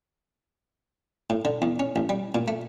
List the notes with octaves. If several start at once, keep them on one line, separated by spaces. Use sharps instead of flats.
A2
D3
E2
C#4
A1
G3
A#2
A3